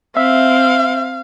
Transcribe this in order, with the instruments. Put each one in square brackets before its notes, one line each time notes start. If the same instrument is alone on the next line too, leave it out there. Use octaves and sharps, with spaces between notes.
[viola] C4 [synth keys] E5 [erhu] F5